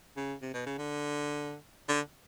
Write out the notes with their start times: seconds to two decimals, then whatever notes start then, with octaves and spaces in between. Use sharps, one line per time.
0.17 C#3
0.42 C3
0.54 B2
0.66 C#3
0.78 D3
1.89 D3